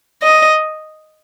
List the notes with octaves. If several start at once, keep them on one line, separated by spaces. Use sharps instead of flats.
D#5